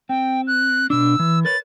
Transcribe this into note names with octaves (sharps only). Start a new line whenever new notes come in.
C4 G5
F#6
B2 D4 E6
E3
A#4 B4 C#5 A6